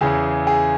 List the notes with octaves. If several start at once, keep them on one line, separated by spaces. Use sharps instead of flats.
E2 C#3 E3 G#4
G#4